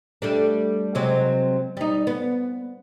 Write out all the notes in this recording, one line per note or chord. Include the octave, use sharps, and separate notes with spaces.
G3 A3 D4
C3 F#3 G#3
G3 D#4
B3